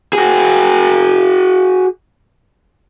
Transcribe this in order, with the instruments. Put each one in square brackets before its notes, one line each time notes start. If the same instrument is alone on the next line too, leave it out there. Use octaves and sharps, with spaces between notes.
[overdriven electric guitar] F#4 G#4